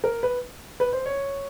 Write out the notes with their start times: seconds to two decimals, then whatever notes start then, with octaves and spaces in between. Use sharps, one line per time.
0.04 A#4
0.23 B4
0.80 B4
0.93 C5
1.06 C#5